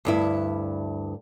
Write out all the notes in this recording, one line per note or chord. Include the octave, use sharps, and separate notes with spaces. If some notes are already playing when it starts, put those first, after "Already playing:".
D2 G2 E4